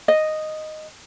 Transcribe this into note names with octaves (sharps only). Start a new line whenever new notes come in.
D#5